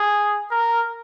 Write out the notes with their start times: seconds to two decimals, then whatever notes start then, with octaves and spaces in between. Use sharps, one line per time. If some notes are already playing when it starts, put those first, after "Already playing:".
Already playing: G#4
0.51 A#4